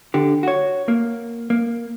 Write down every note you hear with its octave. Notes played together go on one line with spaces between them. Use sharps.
D3 G4
F#4 C#5
A#3
A#3